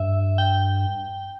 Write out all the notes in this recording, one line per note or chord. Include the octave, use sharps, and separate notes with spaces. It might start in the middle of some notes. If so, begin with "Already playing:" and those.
Already playing: G2 E5
G5